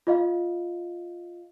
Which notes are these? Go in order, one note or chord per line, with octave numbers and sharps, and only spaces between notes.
F4 D#5 F5